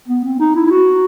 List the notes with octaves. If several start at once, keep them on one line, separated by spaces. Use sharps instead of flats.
B3
C4
D#4
E4
E4
F#4